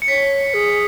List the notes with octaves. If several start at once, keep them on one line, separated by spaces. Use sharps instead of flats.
C#7
C#5 B6
G#4